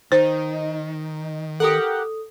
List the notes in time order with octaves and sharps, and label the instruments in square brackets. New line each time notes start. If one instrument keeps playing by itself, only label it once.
[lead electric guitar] D#3 [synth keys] D#4 [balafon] C5
[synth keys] G4 A#4 F#5 [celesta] A4 D#6